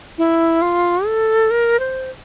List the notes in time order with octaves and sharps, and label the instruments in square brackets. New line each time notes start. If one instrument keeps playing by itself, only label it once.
[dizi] E4
F4
A4
A#4
C5